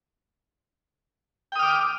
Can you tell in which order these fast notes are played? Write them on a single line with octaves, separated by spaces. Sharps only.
G5 D#6 F6 D6